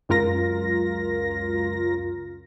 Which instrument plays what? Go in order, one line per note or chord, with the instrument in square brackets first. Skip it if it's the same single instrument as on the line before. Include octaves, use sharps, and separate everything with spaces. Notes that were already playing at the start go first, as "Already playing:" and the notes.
[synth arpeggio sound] C#2 F#2 F4 A#4 A#6